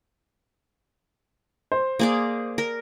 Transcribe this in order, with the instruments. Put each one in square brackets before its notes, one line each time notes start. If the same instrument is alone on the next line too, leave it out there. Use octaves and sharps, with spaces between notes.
[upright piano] C5
[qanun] A#3 G#4 D5
A#4